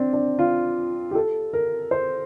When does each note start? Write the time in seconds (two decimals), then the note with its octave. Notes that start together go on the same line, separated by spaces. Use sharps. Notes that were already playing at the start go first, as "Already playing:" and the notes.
Already playing: C4 D4
0.13 D4
0.39 F4
1.11 G4
1.15 A4
1.53 A#4
1.91 C5